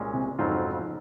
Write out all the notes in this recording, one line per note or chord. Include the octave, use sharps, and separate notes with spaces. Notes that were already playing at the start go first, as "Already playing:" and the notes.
Already playing: C2 A#2 G#3 C#4
C3
F2 G#2 C#3 F#3 C4 F4